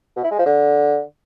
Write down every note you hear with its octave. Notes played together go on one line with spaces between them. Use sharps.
B2
E4
G#3
F3
D3